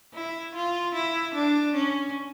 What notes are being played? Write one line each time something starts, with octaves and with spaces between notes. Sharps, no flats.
E4
F4
E4
D4
C#4